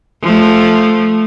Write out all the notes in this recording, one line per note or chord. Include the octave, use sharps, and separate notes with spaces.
F3 A3